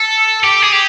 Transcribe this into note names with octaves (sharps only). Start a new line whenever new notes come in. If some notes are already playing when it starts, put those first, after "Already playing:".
Already playing: A4
G4
G#4
G4